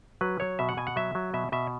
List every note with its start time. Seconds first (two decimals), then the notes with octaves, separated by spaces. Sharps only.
0.21 F#3 B4
0.40 F#3 C#5
0.59 B2 E5
0.69 F#5
0.77 B2 G#5
0.87 F#5
0.96 F#3 E5
1.15 F#3
1.34 B2 E5
1.52 B2 E5